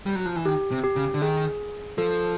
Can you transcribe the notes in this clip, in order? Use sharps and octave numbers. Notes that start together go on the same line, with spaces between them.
G3
F#3
F3
E3
D#3 G4
C3
G4
C#3
D3
D#3 G#4
F3 A4